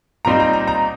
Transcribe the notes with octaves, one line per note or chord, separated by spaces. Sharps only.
A#2 G3 C4 D#4 A#5
A#5
A#5
A#5